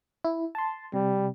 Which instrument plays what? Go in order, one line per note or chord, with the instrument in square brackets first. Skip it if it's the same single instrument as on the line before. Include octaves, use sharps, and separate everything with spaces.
[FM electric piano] E4
A5 C6
[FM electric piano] C3 [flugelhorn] G3